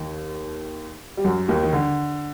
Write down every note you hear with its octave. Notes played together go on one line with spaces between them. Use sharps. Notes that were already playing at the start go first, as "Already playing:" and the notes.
Already playing: D#2 D#3
G3
F#2 F#3
D#2 D#3
D#3
D3